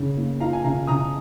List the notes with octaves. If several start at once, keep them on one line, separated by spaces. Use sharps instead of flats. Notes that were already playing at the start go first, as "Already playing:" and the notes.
Already playing: C#3
A#3
F4 F5 A#5
G#5
C#3 F5 A#5
C#3 A#5 D#6